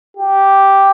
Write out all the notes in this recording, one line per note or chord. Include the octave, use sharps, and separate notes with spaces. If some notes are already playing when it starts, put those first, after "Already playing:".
G4